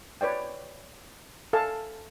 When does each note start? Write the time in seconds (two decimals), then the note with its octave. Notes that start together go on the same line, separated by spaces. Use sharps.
0.21 B4 C#5 D5 G5
1.53 A4 F5 G#5 A5